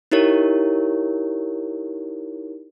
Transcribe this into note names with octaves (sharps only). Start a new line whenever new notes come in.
D#4 E4 G4 A#4 C#5